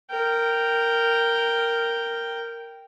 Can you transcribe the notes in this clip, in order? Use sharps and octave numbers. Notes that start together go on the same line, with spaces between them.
A#4 G5